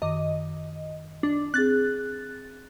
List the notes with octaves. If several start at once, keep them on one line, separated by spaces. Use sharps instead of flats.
F#2 D#3 D#5 D6
D4
C4 G#4 F#6 A6